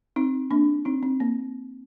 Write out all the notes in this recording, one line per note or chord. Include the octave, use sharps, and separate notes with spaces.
C4 D#4
A#3 D4
C4 D#4
C4
A#3